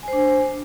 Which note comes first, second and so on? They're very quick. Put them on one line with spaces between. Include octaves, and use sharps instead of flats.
G#5 C5 D4